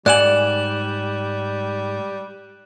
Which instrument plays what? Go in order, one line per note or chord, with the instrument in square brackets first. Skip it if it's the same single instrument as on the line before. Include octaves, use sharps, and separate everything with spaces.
[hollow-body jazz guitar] G#2 F#5 G#5 [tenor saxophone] G3 [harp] D5 [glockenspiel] F#6 E7 F#7